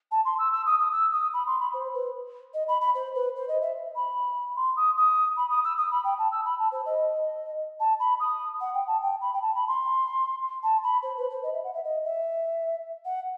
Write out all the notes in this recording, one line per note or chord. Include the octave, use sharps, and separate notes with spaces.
A5
C6
E6
E6
D#6
D#6
E6
D#6
B5
C6
B5
C5
B4
D#5
B5
B5
C5
B4
C5
D#5
E5
B5
C6
D#6
D#6
B5
D#6
E6
D#6
B5
G5
A5
E6
B5
A5
C5
D#5
A5
B5
D#6
F#5
G5
A5
G5
B5
G5
A5
B5
C6
A5
B5
C5
B4
C5
D#5
E5
F#5
E5
D#5
E5
F#5